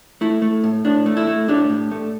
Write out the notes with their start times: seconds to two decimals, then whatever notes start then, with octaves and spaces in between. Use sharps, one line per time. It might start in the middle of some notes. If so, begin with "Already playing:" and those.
0.21 A3 E4
0.42 A3
0.64 A2
0.85 A2 D4
1.06 A3
1.17 E4
1.27 A3
1.48 A2 D4 G4
1.69 A2
1.91 A3